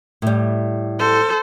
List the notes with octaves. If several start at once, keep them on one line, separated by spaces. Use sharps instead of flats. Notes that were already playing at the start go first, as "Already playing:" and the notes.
A2 G3
A4 C5